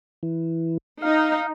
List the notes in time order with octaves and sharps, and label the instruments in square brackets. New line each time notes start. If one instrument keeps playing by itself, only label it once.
[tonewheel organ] E3
[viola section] D#4 [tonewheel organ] F5